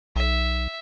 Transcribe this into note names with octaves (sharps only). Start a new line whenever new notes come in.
B1 E5